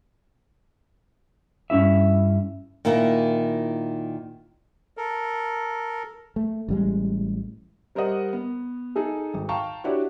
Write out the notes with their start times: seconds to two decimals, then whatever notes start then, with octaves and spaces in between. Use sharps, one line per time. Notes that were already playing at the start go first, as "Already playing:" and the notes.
1.70 G2 C#4 E4 E5
2.85 A#2 D#3 A#3 E4
4.97 A4 A#4
6.36 A3
6.69 A1 G3 G#3
7.95 G3 A#4 C5 D5 D#5 F#5
8.33 B3
8.96 D#4 G#4 A4
9.34 G#1
9.49 F5 G5 A5 A#5 C#6
9.84 D4 E4 F#4 G4 C#5